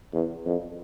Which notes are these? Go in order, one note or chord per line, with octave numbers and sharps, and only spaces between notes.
E2
F2